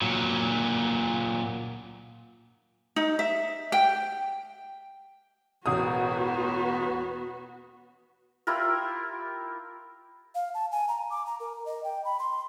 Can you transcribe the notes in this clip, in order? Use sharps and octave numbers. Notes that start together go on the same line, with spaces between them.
A#2 F#3
D#4
E5
G5
E1 A1 B3 F#4 D#6
E4 F4 G4 A#4
F5
A5
G#5
A#5
D6
A#5
A#4
D#5
G5
B5
C6